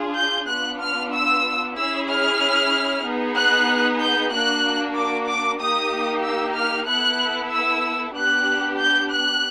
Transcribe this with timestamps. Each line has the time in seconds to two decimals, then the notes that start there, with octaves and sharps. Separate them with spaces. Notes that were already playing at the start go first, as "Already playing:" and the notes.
Already playing: D4 F4 G#4
0.17 G6
0.49 B3 D4 F4 F#6
0.81 F6
1.13 E6
1.77 C#4 E4 G#4 E6
2.09 F6
3.04 B3 D#4 G#4
3.36 F#6
4.00 G6
4.32 A#3 D4 F#4 F#6
4.96 D6
5.28 D6
5.60 A#3 D#4 G4 D#6
6.24 E6
6.56 F6
6.88 B3 E4 A4 F#6
7.52 E6
8.16 B3 D4 G4 F#6
8.80 G6
9.11 F#6